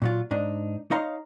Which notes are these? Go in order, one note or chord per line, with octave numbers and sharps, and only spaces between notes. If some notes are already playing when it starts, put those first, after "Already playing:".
A#2 F#3 F4
G#2 D4 D#4
D#4 C#5 D#5 F5 A#5 C6